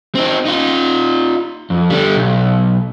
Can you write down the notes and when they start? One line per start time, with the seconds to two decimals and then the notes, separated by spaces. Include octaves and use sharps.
0.15 C4 D#4
0.45 D#4 F4
1.70 F2
1.90 D3 G3
2.16 B1